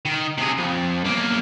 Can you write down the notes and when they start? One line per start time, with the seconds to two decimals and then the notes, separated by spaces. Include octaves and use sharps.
0.06 D#3
0.38 C3 G#4
0.58 F2
1.04 B1 A#3